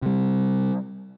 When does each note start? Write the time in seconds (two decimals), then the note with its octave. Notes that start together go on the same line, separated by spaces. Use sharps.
0.02 C3 G3